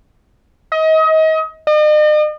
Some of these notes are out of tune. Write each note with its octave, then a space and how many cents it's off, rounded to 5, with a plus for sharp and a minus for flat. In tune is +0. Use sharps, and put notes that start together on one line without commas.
D#5 +30
D#5 -45